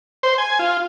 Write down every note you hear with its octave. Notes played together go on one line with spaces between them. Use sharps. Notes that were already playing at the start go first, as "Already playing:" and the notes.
C5
G#5
F4